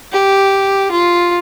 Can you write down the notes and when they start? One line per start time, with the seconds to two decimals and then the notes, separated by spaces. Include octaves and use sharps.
0.12 G4
0.91 F4